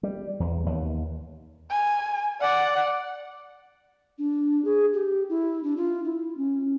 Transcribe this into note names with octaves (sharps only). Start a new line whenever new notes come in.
G3
E2
D#2
G#5
D5 F#5
D4
G#4
G4
E4
D4
F4
E4
C#4